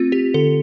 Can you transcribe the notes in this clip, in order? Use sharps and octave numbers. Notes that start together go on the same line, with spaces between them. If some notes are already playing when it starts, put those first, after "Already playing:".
Already playing: A3 C4 F4
G4
D3 A4